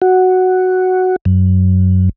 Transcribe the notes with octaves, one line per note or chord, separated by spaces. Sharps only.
F#4
F#2